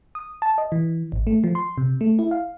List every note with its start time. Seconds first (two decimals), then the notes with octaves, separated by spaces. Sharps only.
0.15 D#6
0.42 A5
0.58 D#5
0.72 E3
1.12 G#1
1.27 A3
1.44 F3
1.55 C6
1.78 C3
2.01 A3
2.19 E4
2.31 F5